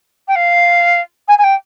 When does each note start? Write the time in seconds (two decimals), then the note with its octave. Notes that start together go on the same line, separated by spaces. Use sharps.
0.28 G5
0.35 F5
1.28 G#5
1.38 G#5
1.44 G5